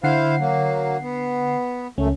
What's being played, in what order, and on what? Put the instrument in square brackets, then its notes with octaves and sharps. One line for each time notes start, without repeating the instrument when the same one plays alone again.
[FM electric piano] D3 F#5 C7 [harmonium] E4 C5 F5
[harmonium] F#3 A#3
B3
[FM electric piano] C#2 C#4 [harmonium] F#2 A3